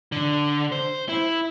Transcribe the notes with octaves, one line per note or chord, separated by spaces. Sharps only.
D3
C5
E4